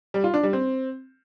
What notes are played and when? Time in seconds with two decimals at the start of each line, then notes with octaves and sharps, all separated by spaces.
0.14 G3
0.24 F4
0.34 D4
0.43 G3
0.53 C4